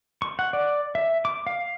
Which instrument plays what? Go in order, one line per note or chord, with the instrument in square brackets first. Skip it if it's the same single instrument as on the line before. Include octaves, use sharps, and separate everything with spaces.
[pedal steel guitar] C#6
F#5
D5
E5
D6
F5